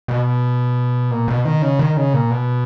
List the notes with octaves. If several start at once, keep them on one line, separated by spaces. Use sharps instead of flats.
B2
A#2
B2
D#3
C#3
D#3
C#3
A#2
B2